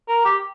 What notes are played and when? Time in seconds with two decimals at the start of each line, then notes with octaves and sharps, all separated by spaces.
0.08 A#4
0.24 G4